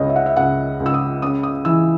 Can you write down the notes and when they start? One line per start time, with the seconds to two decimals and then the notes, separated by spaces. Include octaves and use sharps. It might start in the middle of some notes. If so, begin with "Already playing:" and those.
Already playing: C#2 C#3 C#5 D#5
0.09 E5
0.16 F#5
0.26 E5
0.36 C#2 F#5
0.80 C#2
0.86 E6
0.94 D#6
1.22 C#3 D#6
1.43 D#6
1.65 E3 E6